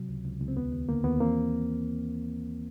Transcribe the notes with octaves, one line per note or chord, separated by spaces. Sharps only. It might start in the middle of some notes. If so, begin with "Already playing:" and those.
Already playing: C3 F#3
C#2
C#2
C#2
C4
D#2 B3
D#2
D3 A#3
D#2 B3
E3 A#3 C4